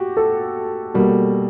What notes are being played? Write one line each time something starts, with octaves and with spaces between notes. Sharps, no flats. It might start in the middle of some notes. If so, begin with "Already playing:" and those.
Already playing: F#4 G4
A4
B2 G3 A#3